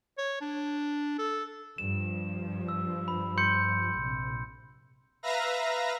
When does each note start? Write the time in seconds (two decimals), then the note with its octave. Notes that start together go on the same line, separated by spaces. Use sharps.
0.18 C#5
0.41 D4
1.18 A4
1.78 G2 F3 E7
2.68 E6
3.08 B5
3.38 C6 G6 C#7
3.91 A#1 C3
5.23 B4 E5 F5 A#5 A#6